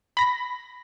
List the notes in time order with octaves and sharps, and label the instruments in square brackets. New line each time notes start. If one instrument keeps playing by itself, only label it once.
[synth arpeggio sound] B5 A#6